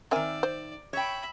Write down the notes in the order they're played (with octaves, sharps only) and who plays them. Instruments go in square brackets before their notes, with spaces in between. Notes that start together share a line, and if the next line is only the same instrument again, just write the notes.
[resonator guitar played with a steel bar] D#3 E5 [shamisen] C4 A#4 G#5 [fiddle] D5
[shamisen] C5
[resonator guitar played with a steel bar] C#5 G5 [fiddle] E5 B5